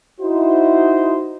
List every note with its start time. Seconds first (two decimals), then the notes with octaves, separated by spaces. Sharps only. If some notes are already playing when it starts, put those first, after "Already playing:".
0.20 D#4 E4 F#4 C5